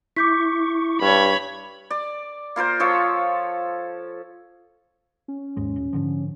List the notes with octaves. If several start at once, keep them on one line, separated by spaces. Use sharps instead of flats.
E4 C#6 D6 G6 B6
G2 C#5 B5
D5
A#3 F4 A#4 C5
F3 A4 C#5
C#4
D#2 G#2 G#3
D#1
G#2 D3 F3